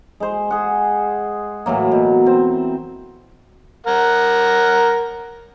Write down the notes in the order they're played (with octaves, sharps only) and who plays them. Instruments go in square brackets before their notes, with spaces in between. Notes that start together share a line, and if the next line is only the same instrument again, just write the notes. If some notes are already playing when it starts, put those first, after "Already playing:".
[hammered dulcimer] G#3 C5
G#4 F#5
A2 E3 F#3 A#3
B2
C4
[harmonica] A#4 F#5